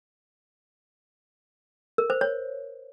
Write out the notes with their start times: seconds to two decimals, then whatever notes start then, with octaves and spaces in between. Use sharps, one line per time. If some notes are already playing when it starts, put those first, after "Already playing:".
1.98 A#4
2.10 C5
2.21 C#5